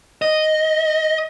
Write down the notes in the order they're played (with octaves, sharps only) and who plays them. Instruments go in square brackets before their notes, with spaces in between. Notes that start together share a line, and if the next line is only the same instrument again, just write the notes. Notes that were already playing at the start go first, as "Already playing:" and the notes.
[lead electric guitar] D#5